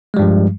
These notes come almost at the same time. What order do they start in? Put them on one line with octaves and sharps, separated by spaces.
G#3 G3 G2 F3